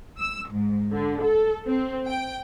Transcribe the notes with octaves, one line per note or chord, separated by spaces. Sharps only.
E6
G#2
D3
A4
C4
G5